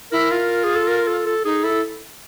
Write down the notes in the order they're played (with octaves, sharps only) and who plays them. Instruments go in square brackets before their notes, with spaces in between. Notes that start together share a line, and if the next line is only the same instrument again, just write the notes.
[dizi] E4 [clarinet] A#4
[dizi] F4
[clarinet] G#4
A4
A#4
A4
A4
[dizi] D#4 [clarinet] G#4
[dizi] E4 [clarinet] A4